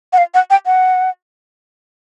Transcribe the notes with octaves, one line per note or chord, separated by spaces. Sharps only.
F#5
F5
F#5
G5
F#5